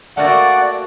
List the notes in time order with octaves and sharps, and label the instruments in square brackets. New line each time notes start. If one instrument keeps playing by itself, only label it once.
[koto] A3 A#3 F#4 [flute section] D5 [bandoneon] F#5